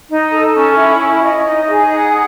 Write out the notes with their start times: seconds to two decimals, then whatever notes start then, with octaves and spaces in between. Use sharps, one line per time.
0.10 D#4
0.32 A4
0.54 C#4
0.77 E4
0.99 C#4
1.23 D#5
1.45 D#4
1.68 G#4
1.90 F#5